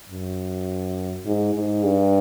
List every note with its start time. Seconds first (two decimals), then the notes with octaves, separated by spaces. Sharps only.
0.10 F#2
1.26 G#2
1.55 G#2
1.84 G2